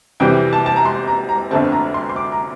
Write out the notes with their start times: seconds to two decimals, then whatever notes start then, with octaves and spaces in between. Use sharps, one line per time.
0.20 F2 C3 E3 G3 G5
0.53 A5
0.66 A5
0.76 A#5
0.85 C6
1.07 A#5
1.29 A#5
1.51 G1 F2 D3 A3 C4 A5
1.72 A#5
1.94 C6
2.09 C6
2.16 D6
2.32 A#5